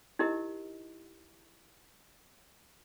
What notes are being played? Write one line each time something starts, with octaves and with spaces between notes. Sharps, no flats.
D#4 E4 G4 A#4 D#5